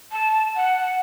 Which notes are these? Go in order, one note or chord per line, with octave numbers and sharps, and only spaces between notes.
A5
F#5